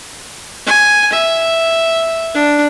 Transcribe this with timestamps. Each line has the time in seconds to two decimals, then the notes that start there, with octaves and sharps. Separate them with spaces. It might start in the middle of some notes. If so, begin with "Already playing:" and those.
0.66 G#5
1.12 E5
2.34 D4